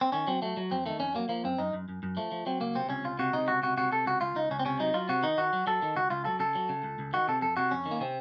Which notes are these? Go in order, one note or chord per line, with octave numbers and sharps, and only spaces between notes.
C4
D#3 C#4
F#3 C4
F#3 A3
F#3
F2 C4
D#3 A3
F2 C#4
F#3 A#3
F3 A#3
F#2 C4
F#2 D#4
F#2
F#2
F#2
F3 A3
F3
F#3 C4
C#2 A#3
C3 C4
C#2 C#4
C#2 F4
C3 F#4
C3 D#4
C#2 F#4
C3 F#4
C3 F#4
C3 A4
C#2 F#4
C#2 F4
C#2 D#4
C#2 C#4
C4
C3 C#4
F#3 D#4
F#3 F4
C3 F#4
D#3 D#4
D#3 F#4
F#3
F#3 A4
D#3
C#2 F#4
C#2 F4
F#3 A4
C#3 A4
F#3
C#3
C#2
C#2
D#3 F#4
C3 A4
F2 A4
C3 F#4
F2 C#4
D#3
A#3
C3 C4